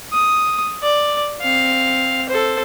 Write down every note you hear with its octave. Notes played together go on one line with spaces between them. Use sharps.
D#6
D5
C4 F5
A4 C5